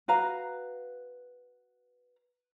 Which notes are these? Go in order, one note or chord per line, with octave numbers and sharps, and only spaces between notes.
F#4 B4 F5 A#5